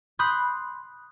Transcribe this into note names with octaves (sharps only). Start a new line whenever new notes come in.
B5 C6 D#6 F#6 G6